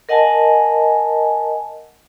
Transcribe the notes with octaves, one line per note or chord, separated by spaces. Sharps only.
A#4 D#5 F#5 G#5 A5